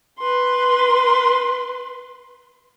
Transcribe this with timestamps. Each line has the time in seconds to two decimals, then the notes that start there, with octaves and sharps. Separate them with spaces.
0.18 B4 C6